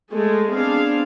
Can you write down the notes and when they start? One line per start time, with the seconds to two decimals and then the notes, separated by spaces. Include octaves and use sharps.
0.11 G#3 A3 G#4
0.51 B3 C4 D4 G#4 F5